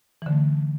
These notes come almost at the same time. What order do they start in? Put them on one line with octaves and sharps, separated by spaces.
E3 D3 A3